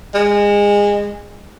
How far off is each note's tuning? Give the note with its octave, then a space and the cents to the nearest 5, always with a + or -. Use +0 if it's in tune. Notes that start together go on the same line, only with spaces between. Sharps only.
G#3 -25